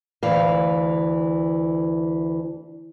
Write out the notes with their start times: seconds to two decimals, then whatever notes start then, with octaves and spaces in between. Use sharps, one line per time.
0.23 D2 E3 F5